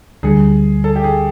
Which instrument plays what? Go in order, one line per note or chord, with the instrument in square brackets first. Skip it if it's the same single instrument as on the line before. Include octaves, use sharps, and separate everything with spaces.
[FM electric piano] D2 D3 G3 [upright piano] G#4
[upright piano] A4
G4
G#4